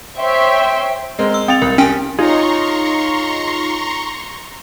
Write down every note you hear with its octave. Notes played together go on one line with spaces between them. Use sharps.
C5 C#5 E5 G5 C6
G#3 C4 A#4
E6
C4 G5 A6 F7
C2 A#4
C#4 G4 G5 B6
D#4 F4 G#4 C#5 A#5 C6 C#6